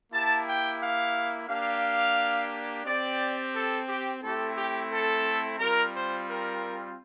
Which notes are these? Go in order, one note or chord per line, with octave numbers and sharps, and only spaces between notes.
A#3 E4 G4 A5
G5
F5
A#3 D4 G4 F5
C4 G4 D5
A4
G4
A3 C4 E4 G4 A4
G4
A4
G3 C4 F4 A#4
C5
A#4